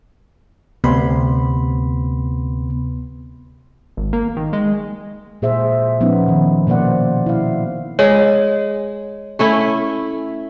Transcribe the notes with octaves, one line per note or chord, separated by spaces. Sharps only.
D2 C3 B3 B5 C6
G#1
A#3
D#3
G#3
A#2 G#4 C5 E5
F3 B3 C#4 D#4
D#3
B2 A#3 C5 D5 F#5
E4 F5
G#3 C#5
A3 C#4 E4